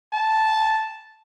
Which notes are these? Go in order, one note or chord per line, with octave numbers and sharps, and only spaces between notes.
A5